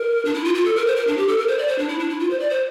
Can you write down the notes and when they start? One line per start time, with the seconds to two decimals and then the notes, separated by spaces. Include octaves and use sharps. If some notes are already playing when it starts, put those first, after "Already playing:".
Already playing: A#4
0.25 D4
0.34 E4
0.45 F4
0.55 F4
0.65 A4
0.76 A#4
0.86 C5
0.96 A#4
1.07 D4
1.17 G4
1.28 A4
1.38 A#4
1.47 C5
1.58 D5
1.67 C5
1.78 D4
1.88 E4
1.99 D4
2.09 E4
2.19 F4
2.30 C5
2.39 D5
2.50 C5